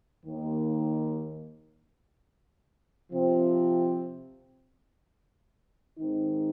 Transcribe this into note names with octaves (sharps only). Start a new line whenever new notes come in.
D#2 D#3 A#3
C3 F3 C4
G#2 D#3 C4 D#4